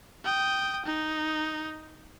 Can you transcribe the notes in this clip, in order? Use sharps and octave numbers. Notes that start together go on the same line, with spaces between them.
G5 D#6
D#4